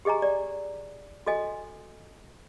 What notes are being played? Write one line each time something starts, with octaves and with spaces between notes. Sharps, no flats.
G4 G#4 D#5 G#5 A#5
D5
F#4 A4 D#5 G#5